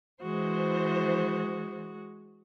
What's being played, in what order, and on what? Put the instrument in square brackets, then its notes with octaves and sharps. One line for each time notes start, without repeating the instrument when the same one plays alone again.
[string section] E3 C5 [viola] G#3 F#4